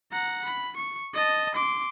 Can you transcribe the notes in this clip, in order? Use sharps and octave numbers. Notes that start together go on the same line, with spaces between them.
F#5 A#5
B5
C#6
D#5 A5
C6 D6